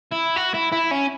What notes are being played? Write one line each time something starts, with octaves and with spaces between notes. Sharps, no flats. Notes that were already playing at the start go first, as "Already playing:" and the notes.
E4
F#4
E4
E4
C#4